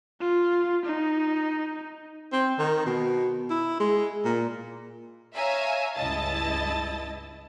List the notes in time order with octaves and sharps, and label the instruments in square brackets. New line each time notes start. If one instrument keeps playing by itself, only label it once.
[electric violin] F4
D#4
[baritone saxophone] C4
D#3
B2
E4
G#3
A#2
[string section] C#5 E5 F5 G#5 A#5
C#2 G2 E4 D#5 A5 A6